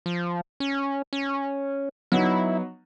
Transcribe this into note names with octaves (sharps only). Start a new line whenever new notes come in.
F3
C#4
C#4
F#3 B3 D#4 E4